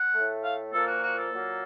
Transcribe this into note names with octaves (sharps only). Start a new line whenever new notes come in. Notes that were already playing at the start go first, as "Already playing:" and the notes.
Already playing: F#5
A2 A3
F5
A#2 F3 A#3 A4
F#4
F#4
A4
A#2 F#3 A#3